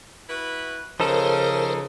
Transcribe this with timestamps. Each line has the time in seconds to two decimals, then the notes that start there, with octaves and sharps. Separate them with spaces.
0.29 E4 F#4 B4
1.00 C#3 F3 D#4 A4 A#4 C5